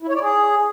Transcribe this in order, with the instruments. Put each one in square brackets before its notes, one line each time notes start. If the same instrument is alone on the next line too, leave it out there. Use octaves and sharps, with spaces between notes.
[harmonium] E4
C#5
D5
G#4